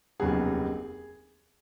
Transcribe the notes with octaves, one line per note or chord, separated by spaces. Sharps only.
F1 D#2 C#3 F#3 B3 G#4